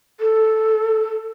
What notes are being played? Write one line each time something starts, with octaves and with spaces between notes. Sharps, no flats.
A4